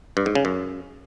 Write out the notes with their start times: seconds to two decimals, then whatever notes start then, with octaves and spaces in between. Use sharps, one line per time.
0.17 G2
0.26 G#2
0.35 C#3
0.45 F#2